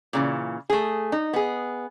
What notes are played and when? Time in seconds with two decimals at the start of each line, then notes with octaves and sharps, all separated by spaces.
0.13 A#2 C#3 E3
0.70 A3 G#4
1.12 D#4
1.33 B3 G#4